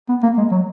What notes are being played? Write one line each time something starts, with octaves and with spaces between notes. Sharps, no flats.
B3
A#3
G#3
F#3